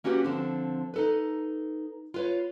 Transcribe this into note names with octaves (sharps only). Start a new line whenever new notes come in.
A#3 C#4 F#4 G4 B4
D3 F3 C4
D#4 A4 B4
F4 B4 C#5